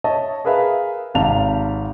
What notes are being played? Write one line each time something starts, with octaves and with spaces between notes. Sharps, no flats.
C#5 D#5 E5 A5
G#4 A#4 B4 E5 F5
G#1 C3 D#4 F5 A5 F7